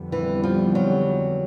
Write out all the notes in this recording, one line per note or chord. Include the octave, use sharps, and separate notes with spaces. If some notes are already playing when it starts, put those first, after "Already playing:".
Already playing: F2 D3 G3 B3
E3
F3
F#3